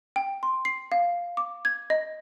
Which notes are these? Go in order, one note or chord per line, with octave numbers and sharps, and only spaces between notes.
G5
C6
C7
F5
D6
G#6
D#5